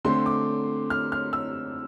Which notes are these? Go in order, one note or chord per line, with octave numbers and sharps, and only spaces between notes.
D3 A3 C4 C6
D6
F6
F6
E6